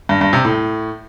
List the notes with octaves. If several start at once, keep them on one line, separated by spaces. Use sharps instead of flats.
G2
G2
C3
A2